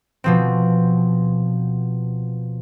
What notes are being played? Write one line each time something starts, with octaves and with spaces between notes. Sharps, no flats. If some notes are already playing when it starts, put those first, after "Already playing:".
B2 F3 C4